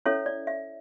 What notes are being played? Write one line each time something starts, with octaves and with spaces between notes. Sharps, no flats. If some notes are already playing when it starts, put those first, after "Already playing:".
C#4 E4 A4 C#5 E5
D5
E5